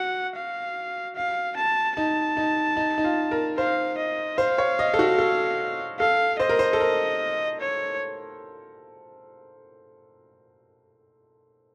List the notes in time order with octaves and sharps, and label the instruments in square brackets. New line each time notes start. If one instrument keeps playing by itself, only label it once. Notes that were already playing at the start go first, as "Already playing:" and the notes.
Already playing: [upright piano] F#4 [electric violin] F#5
[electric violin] F5
F5
A5
[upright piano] D#4 [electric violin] A5
[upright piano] D#4
D#4
D#4
F4
A#4
[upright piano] C5 [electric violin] F5
[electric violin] D#5
[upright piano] C5 [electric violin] F5
[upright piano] C#5
D#5
A4
F#4
A4
[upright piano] A4 [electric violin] F5
[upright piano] C5 [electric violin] D#5
[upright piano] A#4
C5
A4
A#4
[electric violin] C#5